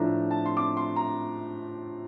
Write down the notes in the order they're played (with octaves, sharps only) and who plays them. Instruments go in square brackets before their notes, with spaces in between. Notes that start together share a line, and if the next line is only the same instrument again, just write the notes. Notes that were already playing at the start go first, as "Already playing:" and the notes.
Already playing: [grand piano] A2 F3 A3 D4 A#5
A5
C6
D6
C6
A#5